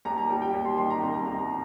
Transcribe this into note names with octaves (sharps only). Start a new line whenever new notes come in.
D#2 A#5
A#5
G3 G5
G5
D#2
C6
D#3 C6
A#5
C2 C6
A#5
C2 A#5
A#5